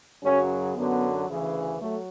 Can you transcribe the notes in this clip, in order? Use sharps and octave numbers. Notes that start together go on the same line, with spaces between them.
F#2 C#3 F#3 C#4
F#2 D3 F#3 B3
D2 C#3 E3
F#3 A3